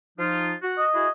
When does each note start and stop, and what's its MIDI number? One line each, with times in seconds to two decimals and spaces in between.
0.18 0.54 53
0.18 0.54 63
0.18 0.54 65
0.63 0.85 66
0.78 1.10 75
0.94 1.07 64
0.94 1.07 66
0.94 1.07 68